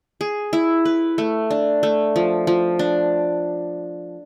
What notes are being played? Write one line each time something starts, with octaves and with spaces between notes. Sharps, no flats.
G#4
E4
B4
A3
D4
A3
F3
F3
D4